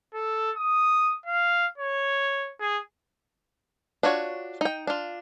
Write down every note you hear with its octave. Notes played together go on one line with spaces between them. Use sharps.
A4
D#6
F5
C#5
G#4
D4 F4 F#4 C#5
D#4 G5
D4 F4